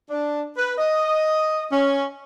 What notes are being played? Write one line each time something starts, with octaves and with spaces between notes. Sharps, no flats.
D4
B4
D#5
C#4